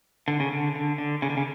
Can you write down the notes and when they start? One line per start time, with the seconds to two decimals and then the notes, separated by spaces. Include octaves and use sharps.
0.28 D3
0.40 C#3
0.51 D3
0.75 D3
0.98 D3
1.22 C#3
1.30 D3
1.37 C#3